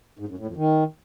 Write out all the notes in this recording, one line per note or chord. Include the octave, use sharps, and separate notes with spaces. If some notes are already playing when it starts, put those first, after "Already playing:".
G#2
F#2
A2
F2
D#3